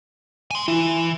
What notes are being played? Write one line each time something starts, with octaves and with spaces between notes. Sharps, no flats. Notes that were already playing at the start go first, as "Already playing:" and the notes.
G#5 C6
E3 E4